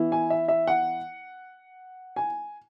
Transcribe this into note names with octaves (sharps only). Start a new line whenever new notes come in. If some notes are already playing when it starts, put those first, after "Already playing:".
Already playing: E3 B3 E4
G#5
E5
E5
F#5
G#5